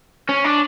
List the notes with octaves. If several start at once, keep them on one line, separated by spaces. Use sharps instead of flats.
C#4
D4